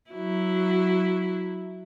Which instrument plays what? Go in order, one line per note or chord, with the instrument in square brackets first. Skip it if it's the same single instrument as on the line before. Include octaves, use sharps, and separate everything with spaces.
[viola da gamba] F#3 E4